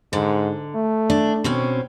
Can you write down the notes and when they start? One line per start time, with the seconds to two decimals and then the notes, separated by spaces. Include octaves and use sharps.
0.13 G#2 D3
0.75 A3
1.10 D4
1.44 B2 C4 C#4